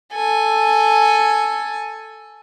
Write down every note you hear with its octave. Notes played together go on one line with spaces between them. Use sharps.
A4 G#5